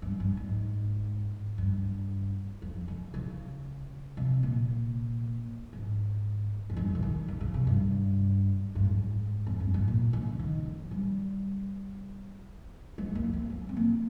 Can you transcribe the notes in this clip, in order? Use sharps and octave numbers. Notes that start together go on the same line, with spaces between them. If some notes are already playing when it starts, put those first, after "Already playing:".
G2
G2
G#2
G2
F2
C#3
C#3
C3
A#2
G#2
F2
G2
C#3
D#3
D#3
C#3
C3
G2
G2
G#2
F2
G2
G#2
A#2
C#3
D#3
F3
G3
G#3
A#3
C4
C#4
C4
A#3